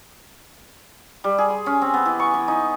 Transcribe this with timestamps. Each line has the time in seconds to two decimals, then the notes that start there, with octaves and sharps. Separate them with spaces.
1.24 G3
1.38 G#4
1.50 C6
1.66 C#4
1.82 C4
1.94 B3
2.06 E3
2.19 C#6
2.34 E3
2.48 D#4